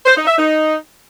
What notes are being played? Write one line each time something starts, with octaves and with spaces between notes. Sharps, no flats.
C5
D#4
E5
D#4